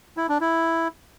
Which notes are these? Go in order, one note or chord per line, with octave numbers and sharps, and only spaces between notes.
E4
D4
E4